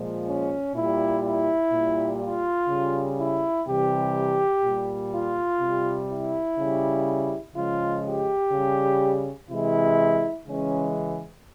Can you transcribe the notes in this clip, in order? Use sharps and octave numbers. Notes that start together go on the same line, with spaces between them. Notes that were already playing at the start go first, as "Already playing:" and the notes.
Already playing: A#2 F3 G#3
C#4
A#2 G3 E4
E4
A#2 G3
F4
C#3 G3
E4
C3 E3 G3 G4
A#2 G3
F4
C3 G3
E4
C#3 G3
C#3 F3 G#3 F4
G4
C#3 G3
C3 E3 G#3 E4
C#3 E3 G#3 C#4